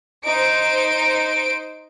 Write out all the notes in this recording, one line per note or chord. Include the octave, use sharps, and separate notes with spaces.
D#4 C5 D7